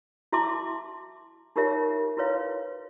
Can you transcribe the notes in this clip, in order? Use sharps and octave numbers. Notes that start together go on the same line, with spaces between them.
E4 F#4 E5 A5 C6 D6
D#4 F4 G4 A#4 C#5 E5
E4 F#4 B4 C#5 F5